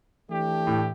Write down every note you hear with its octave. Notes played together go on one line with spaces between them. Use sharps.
E3 A3 D4 G4
A2